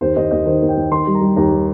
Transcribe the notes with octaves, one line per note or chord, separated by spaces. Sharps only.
D#2 C5
D#2 D#5
D#2 D#5
D#3 C5
D#2
G5
D#2
D#3 C6
G3
A#5
G3
D#2 A#5
G3